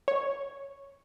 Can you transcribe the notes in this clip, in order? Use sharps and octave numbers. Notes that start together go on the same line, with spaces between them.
C#5